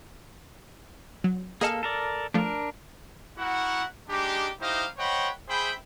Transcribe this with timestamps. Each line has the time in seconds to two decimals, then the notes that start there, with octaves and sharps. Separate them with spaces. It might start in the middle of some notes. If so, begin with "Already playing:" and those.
1.24 F#3
1.61 A#3 G#4 A4 D#5 F5
1.83 A4 A#4 D5
2.34 F3 A3 D4 F4 A#4
3.38 E4 F#4 A#4 F#5
4.09 G#3 D4 D#4 G4
4.61 D#4 E4 G4 C5 D#5 F5
4.97 C5 C#5 D#5 F#5 G5 B5
5.49 G#4 C5 E5 G5 B5